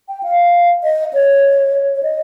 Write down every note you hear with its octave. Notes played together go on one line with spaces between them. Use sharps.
G5
F5
D#5
C#5
C#5
D#5